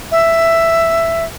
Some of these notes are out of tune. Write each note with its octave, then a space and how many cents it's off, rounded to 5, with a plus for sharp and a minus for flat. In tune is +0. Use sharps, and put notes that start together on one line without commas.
E5 +10